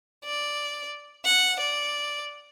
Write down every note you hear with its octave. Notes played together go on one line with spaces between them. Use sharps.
D5
F#5
D5